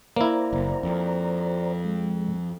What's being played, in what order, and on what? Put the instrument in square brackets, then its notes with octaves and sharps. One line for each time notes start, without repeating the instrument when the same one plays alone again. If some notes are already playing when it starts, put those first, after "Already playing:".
[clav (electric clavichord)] A#3 E4 [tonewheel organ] C5 D5 A#5
[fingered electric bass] F#1
F2
[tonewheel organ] G#3